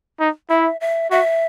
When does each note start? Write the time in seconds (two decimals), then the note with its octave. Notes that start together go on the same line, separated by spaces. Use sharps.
0.20 D#4
0.50 E4 E5
0.81 E5
1.11 F#4 E5